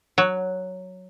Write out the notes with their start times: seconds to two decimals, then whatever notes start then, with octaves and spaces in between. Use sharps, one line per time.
0.18 F#3